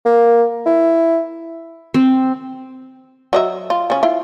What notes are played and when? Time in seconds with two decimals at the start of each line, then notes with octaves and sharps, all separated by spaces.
0.05 A#3
0.66 E4
1.94 C4
3.33 F#3 D#5 E5
3.70 F4
3.90 C#3 C#4
4.03 E4 F4